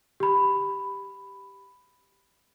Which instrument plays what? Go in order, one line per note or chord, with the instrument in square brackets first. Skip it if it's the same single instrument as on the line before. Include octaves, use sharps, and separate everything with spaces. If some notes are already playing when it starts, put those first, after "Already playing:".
[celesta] G4 B5